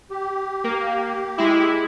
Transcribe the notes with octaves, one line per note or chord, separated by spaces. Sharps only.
G4
A#3
G#3 E4